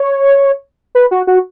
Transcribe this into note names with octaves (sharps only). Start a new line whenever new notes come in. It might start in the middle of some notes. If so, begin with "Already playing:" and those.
Already playing: C#5
B4
F#4
F#4